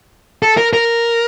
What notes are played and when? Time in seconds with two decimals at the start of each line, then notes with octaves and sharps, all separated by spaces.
0.43 A4
0.57 A#4
0.73 A#4